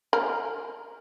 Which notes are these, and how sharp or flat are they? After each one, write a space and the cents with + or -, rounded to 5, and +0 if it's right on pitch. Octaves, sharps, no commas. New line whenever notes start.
A#4 -15